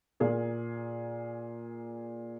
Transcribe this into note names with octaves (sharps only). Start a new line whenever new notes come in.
A#2 G#4 A#4